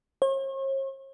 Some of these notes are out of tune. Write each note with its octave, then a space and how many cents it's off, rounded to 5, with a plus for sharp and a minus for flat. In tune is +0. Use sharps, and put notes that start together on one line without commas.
C#5 -45